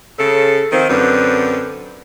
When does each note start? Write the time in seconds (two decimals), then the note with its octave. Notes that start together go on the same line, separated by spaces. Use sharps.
0.18 C#3 A4
0.72 D#3 F3 C4
0.89 F#2 D3 C4 B4